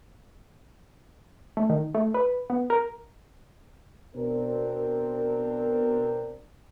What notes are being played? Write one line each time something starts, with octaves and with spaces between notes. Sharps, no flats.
A3
D#3
A3
B4
B3
A#4
B2 C4 D4 A#4